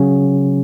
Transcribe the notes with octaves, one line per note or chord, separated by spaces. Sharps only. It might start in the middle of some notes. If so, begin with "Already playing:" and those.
Already playing: C#3 F#3 C#4